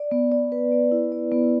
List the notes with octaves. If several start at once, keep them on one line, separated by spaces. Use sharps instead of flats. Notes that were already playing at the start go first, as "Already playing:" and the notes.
Already playing: D5
B3
D5
B4
B3
E4
D5
B3